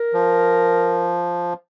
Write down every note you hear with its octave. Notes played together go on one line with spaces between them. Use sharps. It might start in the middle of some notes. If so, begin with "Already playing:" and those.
Already playing: A#4
F3